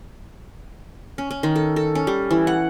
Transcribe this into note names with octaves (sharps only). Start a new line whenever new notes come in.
C#4
C#4
D#3
A4
A4
C#4
G3
E3
F#5